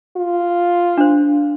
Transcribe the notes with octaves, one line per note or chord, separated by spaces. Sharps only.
F4
D4 C5